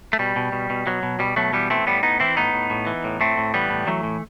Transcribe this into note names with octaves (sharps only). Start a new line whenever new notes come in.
A3
B2 G3
B2
B2
B2
B2 F#3
B2
B2 G3
B2 F#3 A3
E3 G3 B3
E3 A3 C4
A2 G3 B3
A2 B3 D#4
E3 C4 E4
A2 B3 D#4
A2
A2
E3
A2
A2 A3 C4
A2
E3 G3 B3
A2
E3 F#3 A3
A2